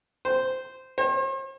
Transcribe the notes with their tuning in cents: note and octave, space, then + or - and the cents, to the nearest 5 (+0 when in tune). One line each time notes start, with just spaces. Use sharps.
C5 -10
C5 +45